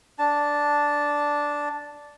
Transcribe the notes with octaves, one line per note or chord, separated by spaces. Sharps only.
D4 A5